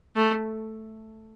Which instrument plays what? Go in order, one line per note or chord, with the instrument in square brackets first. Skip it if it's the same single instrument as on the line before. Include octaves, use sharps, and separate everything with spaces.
[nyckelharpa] A3